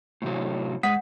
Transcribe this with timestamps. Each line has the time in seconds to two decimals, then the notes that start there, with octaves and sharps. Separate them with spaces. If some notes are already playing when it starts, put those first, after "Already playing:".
0.22 A2 C3 F#3
0.83 G#2 F#5 D#6 B6